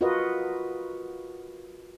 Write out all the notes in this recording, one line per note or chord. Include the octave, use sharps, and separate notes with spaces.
F4 F#4 A#4 B4 D#5